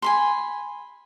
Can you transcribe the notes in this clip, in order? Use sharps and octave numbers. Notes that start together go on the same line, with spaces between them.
G#5 B5 C6